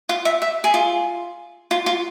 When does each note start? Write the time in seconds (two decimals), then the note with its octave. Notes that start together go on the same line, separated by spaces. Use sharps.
0.09 F4
0.25 E5
0.42 E5
0.64 G#4
0.74 F4
1.71 F4
1.86 F4